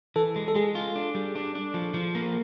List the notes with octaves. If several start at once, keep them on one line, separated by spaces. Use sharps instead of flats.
E3 A4
G#3
A4
G#3 G#4
F4
D4
G3
D4
D4
F3
F3
A#3